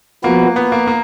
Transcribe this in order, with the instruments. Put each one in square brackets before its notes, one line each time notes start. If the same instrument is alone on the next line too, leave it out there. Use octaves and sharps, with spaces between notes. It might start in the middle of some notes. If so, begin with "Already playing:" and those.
[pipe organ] F3 B3 F#4 B4 [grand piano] A#3
[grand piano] B3
A#3
A#3